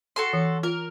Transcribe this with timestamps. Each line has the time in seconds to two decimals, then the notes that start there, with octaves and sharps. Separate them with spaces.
0.16 F#4 A4 C6
0.33 E3
0.63 F4 A#4